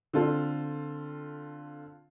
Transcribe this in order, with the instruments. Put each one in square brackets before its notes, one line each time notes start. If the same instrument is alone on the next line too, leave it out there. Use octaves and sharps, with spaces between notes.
[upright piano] D3 C4 F4 A4